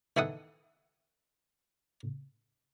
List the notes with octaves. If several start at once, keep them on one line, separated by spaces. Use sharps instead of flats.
D#3 E3 E4 A4 F#5 D#6